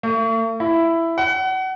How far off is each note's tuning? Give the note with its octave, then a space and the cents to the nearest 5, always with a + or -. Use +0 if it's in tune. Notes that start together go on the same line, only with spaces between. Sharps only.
A3 +45
E4 +10
F#5 +30